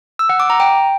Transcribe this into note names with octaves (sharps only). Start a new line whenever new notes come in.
E6
F#5
D6
A#5
G5